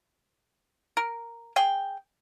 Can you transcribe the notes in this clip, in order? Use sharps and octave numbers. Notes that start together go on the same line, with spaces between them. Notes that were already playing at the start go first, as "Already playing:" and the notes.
A#4
G#4 G5